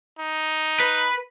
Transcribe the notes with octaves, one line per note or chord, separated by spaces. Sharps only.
D#4
B4